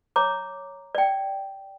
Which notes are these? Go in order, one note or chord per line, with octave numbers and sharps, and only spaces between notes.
C#5 A#5 D6
D5 G5